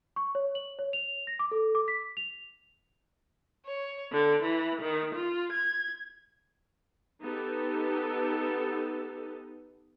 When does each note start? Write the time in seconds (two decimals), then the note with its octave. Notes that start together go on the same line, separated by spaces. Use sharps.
0.16 C#6
0.35 C#5
0.55 F#7
0.79 C#5
0.93 F7
1.27 A#6
1.39 D6
1.51 A4
1.75 D6
1.88 B6
2.17 F7
3.66 C#5
4.11 D3
4.43 E3
4.81 D#3
5.15 F4
5.52 G#6
7.21 B3 D#4 G4 A4